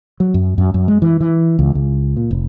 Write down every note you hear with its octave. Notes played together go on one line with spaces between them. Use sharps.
F#3
F#2
F#2
F#2
G#3
E3
E3
C#2
C#2
A#2
F1